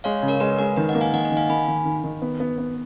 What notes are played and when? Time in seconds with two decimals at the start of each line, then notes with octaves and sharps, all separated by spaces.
0.04 G#3 C#5 F5
0.23 C#3
0.28 A#4 C#5
0.40 G#3 B4
0.58 G#3 A#4
0.77 D#3 B4
0.89 D#5 F#5
0.95 A#3
1.01 F5 G#5
1.13 D#3 D#5 F#5
1.25 D#5 F#5
1.32 D#3
1.37 F5 G#5
1.50 D#3 G#5 B5
1.68 D#3
1.85 D#3
2.04 D#3
2.22 B3
2.40 B3
2.58 B3